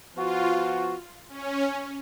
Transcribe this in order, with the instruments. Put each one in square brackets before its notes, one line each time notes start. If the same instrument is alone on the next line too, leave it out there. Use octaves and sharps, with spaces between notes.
[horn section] F3 B3 F#4 [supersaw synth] F4
[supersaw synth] C#4